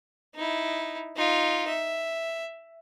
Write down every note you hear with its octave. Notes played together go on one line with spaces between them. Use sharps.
D#4 E4
D#4 F4
E5